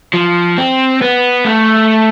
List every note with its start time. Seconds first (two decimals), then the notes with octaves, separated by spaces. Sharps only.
0.14 F3
0.58 C4
1.02 B3
1.45 A3